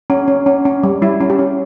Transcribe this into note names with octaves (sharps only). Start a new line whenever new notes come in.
C#4
C#4
C#4
C#4
G3
G3 E4
C#4
G4
C#4